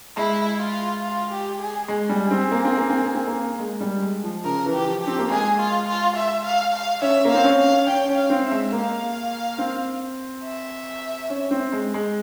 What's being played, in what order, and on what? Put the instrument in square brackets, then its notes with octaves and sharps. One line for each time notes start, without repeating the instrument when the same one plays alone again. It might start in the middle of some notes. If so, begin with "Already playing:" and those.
[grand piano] G#3 [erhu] E4
[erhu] F4
F4
G4
G#4
[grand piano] G#3 [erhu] G#4
[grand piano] G3
C4
A#3
C4
A#3
C4
A#3
C4
A#3
G#3
G3
G#3
F3
[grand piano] C#3 [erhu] A#4
[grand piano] E3
[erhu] G4
[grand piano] F3
[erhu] G4
[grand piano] C4
A#3
[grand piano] G#3 [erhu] G#4
[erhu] F4
F4
E5
F5
F5
[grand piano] C#4 [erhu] E5
[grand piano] A#3
[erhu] F5
[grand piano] C4
C#4
[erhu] F5
[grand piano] C#4 [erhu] G5
[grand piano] C#4
[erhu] F5
[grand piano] C4
[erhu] E5
[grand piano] G#3
[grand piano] A#3 [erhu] F5
[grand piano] C4
[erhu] E5
[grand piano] C#4
C4
G#3
G#3